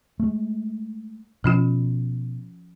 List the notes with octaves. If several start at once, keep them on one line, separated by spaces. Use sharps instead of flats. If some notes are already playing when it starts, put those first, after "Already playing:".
G#3 A3
B2 F3 C#4 F4